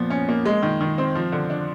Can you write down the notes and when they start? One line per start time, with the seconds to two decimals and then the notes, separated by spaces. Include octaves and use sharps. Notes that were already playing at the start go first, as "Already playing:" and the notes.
Already playing: A#2 F3 B3
0.10 C#4
0.29 A#3
0.45 G#3
0.63 D#3
0.81 D#3
0.98 C4
1.15 F3
1.32 D3
1.50 D4